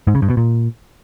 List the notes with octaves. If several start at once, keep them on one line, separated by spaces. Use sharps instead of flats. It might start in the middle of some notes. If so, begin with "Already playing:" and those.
G#2
C#3
G2
B2
A#2